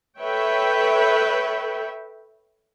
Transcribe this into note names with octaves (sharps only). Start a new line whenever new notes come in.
A4 B4 C#5 E5 G5